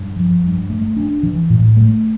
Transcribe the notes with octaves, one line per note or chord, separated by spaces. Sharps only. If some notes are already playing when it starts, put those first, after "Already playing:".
Already playing: G2
F3
G2
A3
D4
E3
A2
A3